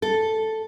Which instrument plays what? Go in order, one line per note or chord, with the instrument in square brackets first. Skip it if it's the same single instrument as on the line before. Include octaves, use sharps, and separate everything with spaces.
[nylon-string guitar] A4